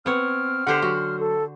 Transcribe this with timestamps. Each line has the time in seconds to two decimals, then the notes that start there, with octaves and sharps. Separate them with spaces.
0.06 B3 C4 C#5 F6
0.67 D3 G4 C5 F#5
0.82 F#3 F#4
1.20 A4